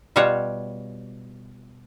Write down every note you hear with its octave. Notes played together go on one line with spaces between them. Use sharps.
B2 G3 F4 C#5 F#5 A5